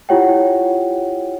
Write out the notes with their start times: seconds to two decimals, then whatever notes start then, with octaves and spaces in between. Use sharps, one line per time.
0.09 E4 F4 G4 C#5 F#5 G5